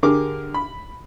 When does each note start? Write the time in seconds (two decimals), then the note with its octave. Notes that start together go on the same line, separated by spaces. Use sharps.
0.03 D3 G4 G#4 A#4 D6
0.54 B5